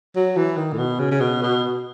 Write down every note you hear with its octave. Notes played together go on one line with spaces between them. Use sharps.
F#3
E3
D#3
A2
B2
C#3
C#3
B2
B2